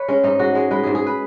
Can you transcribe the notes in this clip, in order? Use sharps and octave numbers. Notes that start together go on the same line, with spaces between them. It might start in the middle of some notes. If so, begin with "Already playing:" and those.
Already playing: B4 C#5
G#3 C#4
G#2 D#4
G#3 F#4
G#3 G#4
G#3 B4
G#2 G#4
G#4
B4